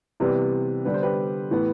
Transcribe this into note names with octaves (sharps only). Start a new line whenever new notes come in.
C3 E3 G3 B3 G4
D3 G3 B3 B4
C5
G4 B4
A2 E3 B3